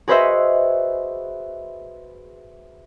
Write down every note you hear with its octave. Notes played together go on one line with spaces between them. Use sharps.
F#4 G#4 B4 C5 D#5 E5